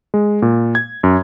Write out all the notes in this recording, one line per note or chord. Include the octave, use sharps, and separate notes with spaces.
G#3
A#2
G#6
F#2